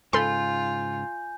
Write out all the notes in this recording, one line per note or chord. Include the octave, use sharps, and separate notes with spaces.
G#2 C#3 F4 A4 G#5 B5 C6 G6